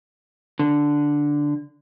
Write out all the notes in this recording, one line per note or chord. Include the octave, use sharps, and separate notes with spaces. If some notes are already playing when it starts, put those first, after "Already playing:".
D3